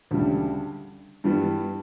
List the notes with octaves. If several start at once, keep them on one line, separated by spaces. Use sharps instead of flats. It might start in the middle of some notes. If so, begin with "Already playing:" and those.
D2 C#3 G3 D4
G2 E3 G3 B3